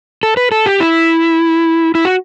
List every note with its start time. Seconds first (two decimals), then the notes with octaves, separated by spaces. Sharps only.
0.23 A4
0.37 B4
0.52 A4
0.66 G4
0.80 E4
1.95 E4
2.05 F#4